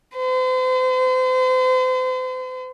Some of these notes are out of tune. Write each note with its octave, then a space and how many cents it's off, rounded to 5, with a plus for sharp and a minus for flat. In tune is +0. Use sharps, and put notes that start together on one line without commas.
C5 -40